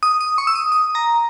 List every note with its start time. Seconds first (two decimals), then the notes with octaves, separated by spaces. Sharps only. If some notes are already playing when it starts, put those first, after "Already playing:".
0.03 D#6
0.21 D#6
0.38 C#6
0.47 E6
0.55 D#6
0.72 D#6
0.95 A#5